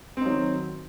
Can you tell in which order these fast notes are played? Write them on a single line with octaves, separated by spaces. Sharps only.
C4 D#4 F#3 D#3